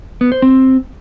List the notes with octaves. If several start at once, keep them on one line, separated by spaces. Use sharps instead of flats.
B3
C5
C4